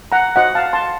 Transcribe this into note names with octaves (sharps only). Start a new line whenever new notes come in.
F#5 A#5
F#4 C5 D#5 F#5
F5 A5
A5 C6